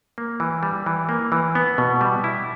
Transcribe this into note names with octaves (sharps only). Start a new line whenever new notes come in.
A#3
E3
G3
E3
A#3
E3
B3
B2
G3
E4